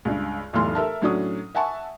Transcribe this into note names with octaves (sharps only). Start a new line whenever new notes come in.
C#2 G2
F1 B1 A2 E3 C6 F6
A4 A#4 E5 A5
A2 F#3 C#4 D4 F#4 D#6
E5 F#5 G#5 A5 C#6